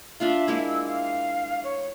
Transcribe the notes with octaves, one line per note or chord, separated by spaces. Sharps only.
D4 F4 E5 F5
G#3 A#3 E4
E6
F5
C#5